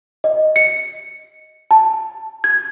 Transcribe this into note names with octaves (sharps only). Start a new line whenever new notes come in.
D#5
C#7
A5
G#6